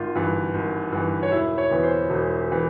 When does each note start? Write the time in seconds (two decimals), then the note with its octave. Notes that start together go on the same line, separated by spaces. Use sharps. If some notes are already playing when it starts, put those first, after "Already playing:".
Already playing: G#1 F4
0.15 G2 E3
0.54 G#1
0.92 G2 E3
1.23 C#5
1.32 E1 E4 E5
1.58 C#5
1.71 E2 E3
1.83 C5
2.10 E1
2.52 E3